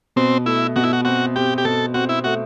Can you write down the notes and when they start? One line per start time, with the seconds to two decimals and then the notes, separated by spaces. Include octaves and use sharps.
0.16 B2 C4
0.46 A3 E4
0.76 B2 F#4
0.83 E4
0.93 F#4
1.05 C4 F#4
1.36 C4 G4
1.58 G4
1.65 B2 A4
1.94 C4 F#4
2.09 E4
2.24 A3 F#4